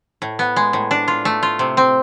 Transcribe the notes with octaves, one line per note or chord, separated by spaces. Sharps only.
A2
B3
G#3
A2
D4
F4
A3
F4
C3
C4